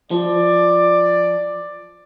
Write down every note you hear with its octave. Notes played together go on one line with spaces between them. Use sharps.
F3 D5